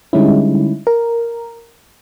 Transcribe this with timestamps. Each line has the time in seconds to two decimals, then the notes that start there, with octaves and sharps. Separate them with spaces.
0.13 D3 G3 G#3 C#4 D#4 E4
0.87 A#4